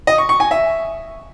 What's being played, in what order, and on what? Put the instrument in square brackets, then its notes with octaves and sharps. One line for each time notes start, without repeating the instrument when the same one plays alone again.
[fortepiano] D#5
C#6
C#6
G#5
E5